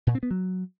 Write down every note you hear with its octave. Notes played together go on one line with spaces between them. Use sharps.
A#2
C4
B3
F#3